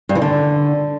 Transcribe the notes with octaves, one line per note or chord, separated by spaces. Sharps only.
G2
E3
D3